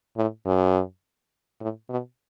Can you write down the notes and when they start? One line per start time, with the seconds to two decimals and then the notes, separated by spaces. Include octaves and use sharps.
0.17 A2
0.46 F#2
1.61 A2
1.89 B2